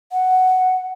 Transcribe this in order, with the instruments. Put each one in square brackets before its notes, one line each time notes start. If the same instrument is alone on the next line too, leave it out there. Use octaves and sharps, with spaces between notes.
[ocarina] F#5